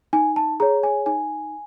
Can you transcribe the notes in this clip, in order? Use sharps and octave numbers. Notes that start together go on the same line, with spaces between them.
D#4 G#5
A5
G#4 C#5 A#5
G#5
D#4 G#5